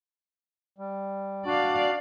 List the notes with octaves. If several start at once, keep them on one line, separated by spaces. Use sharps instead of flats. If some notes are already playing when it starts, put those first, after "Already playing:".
G3
D4 F#4 D5 F5